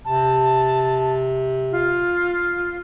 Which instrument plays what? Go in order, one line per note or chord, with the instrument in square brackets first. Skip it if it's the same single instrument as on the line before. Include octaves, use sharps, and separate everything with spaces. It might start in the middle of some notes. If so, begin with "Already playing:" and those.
[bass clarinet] C3 [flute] A5
[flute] F4